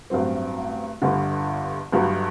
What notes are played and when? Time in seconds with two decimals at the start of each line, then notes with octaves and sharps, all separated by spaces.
0.10 A1 G2 F#3 C4
1.02 G1 G2 D3
1.92 G1 G2 F#3